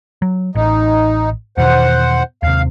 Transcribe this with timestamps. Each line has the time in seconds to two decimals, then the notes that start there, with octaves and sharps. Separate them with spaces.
0.22 F#3
0.55 A1 D#4
1.58 E2 B2 D#3 C5 F#5
2.43 D#2 C3 F5